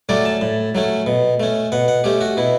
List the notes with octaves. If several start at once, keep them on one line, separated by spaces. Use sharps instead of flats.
F#3 A3 C#4 D5
A5
A2
F#3 A3 C#4
B2
A3 C#4
B2 F#5
F#5
A3 C#4 G4
F#4
B2 E4